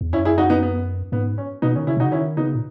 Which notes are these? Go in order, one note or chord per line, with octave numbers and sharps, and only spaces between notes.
E2
F#2 C#4 E4
E4 G#4
D#4 F#4
B3 D#4
B3
G#2 B3
C#4
B2 B3 D#4
D#3 C#4
C#3 C#4 E4
B2
D#4 F#4
C#3
D#3 C#4 E4
C#3 B3 D#4
A#2